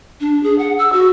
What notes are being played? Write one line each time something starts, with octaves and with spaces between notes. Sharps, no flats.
D4
G#4
F#5
E6
F#4